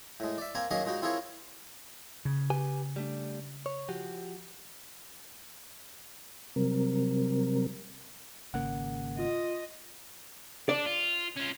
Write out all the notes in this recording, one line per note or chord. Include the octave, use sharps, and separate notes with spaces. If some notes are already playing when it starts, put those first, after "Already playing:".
A2 G#3
D5 E5
A#3 C4 A#4 G#5
D#3 F#3 A#3 C#4 G#4 D#5
A#2 G#3 D#4 F#4
C4 E4 F4 G#4 A#4 C#5
C#3
G4 B4 G#5
G3 A3 D4
C#5
F3 F#4 G4
C3 F#3 G3 C4 A#4
G#1 C#3 A#3 F#5
F4 D#5
D4 D5
F4
C#4 F4